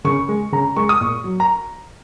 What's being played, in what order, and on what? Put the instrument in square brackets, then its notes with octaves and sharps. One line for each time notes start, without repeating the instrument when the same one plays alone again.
[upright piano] C#3 C#6
G#3
C#3 A#5
G#3 C#6
D#6
A#2 C#6
F#3
A#5